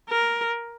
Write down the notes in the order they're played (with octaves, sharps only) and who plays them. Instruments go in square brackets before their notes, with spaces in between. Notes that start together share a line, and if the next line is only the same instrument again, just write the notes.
[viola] A#4